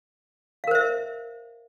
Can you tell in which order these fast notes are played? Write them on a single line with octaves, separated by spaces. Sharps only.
F5 A#4 C5 E5